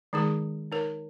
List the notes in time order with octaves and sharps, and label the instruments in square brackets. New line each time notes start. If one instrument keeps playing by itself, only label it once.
[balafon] D#3 G#3 D#4 G#4
D#4 A#4 C#5